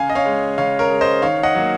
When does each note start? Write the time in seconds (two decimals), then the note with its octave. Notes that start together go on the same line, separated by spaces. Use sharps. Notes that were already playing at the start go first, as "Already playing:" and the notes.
Already playing: C#3 F5 G#5
0.10 D#5
0.15 C#5 F5
0.26 G#3
0.58 C#3 C#5 F5
0.79 A#4 C#5
0.91 G#3
1.01 C5 D#5
1.22 D#3 C#5 F5
1.43 D#5 F#5
1.55 F#3 A#3